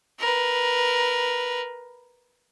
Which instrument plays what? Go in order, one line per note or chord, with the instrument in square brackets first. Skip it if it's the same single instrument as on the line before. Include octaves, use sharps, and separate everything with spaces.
[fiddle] A#4 B4